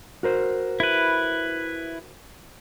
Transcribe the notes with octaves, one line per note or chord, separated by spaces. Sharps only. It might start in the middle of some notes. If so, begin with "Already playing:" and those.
F#4 A#4 C5
E4 B4